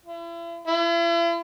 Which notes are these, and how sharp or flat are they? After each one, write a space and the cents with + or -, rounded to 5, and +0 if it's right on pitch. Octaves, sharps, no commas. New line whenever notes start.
E4 +40
E4 +45